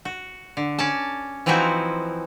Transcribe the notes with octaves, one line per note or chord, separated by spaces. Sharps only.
F#4
D3
C#4 D5 A5
E3 F3 C4 D#4 E4 F#4